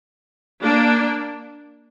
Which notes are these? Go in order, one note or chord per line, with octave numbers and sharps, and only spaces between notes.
A#3 D4